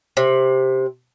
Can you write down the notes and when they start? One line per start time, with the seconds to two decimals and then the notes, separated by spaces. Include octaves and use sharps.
0.17 C3